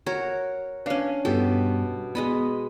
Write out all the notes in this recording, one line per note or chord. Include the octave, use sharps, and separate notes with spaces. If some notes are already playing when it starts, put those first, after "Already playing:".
F#4 A#4 C#5
C#4 D4 B4 F5
G2 B2 B3 G4 A4
G#3 B3 D#5 B5